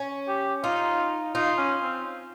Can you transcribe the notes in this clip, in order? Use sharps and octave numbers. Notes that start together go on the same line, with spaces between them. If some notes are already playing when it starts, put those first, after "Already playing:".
Already playing: C#4
G4
D#4 F4
D#4 F4
C#4
C4